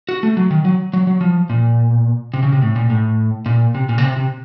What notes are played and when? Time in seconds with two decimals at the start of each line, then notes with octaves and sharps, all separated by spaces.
0.09 F#4
0.23 A3
0.37 F#3
0.51 D#3
0.65 F#3
0.93 F#3
1.07 F#3
1.21 F3
1.50 A#2
2.34 C3
2.43 C#3
2.53 C3
2.62 A2
2.76 A#2
2.90 A2
3.46 A#2
3.75 C3
3.89 A#2
3.98 C#3
4.03 C3
4.16 C3